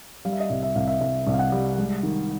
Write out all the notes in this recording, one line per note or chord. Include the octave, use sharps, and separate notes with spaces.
G3 F5
E5
D#5
C2 E5
E5
C2 F5
E5
C2 E5
C2
F5
F#5
G3
G#3
D#3